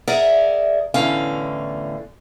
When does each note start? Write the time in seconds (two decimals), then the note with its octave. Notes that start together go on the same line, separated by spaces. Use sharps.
0.08 G#4 A#4 D5 E5 F#5 A#5
0.94 E2 A2 D3 C#4 F5